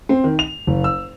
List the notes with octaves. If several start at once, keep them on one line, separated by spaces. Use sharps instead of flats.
C4
D#3
F7
F#1
E6